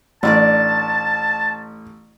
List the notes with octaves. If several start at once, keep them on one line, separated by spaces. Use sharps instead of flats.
A1 D4 B4 D5 A5